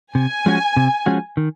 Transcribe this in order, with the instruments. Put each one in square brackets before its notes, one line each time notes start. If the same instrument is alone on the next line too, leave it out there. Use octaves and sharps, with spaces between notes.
[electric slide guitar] C3 [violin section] G#5
[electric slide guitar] F3 G#3 C#4 F#4
C3
F3 G#3 C#4 F#4
D#3